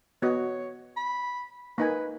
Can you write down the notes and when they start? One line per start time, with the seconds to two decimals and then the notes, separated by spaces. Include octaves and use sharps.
0.22 B3 F#4 C#5 D#5
0.96 B5
1.78 A#3 D#4 B4 G#5